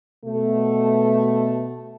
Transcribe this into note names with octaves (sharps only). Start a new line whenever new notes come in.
B2 A3